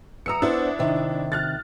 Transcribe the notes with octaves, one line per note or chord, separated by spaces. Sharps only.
E2 A#5 D#6 E6 C#7
B3 D4 E4 C5
C3 D#3
F6 F#6 A6